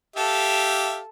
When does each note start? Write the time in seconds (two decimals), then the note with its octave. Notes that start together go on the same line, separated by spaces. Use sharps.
0.16 G4 A4 E5 F5